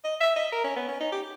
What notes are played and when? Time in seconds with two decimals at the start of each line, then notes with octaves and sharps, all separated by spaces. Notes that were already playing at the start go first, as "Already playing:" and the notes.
0.04 D#5
0.21 E5
0.36 D#5
0.53 A#4
0.64 C#4
0.77 B3
0.88 C#4
1.01 D#4
1.12 G4